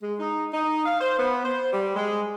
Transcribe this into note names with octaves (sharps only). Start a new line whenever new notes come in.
G#3
D#4
D#4
F5
C5
B3
C5
G3
G#3